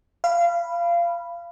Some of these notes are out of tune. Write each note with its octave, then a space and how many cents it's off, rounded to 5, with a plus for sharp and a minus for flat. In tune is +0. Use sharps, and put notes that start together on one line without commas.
F5 -25 B5 +0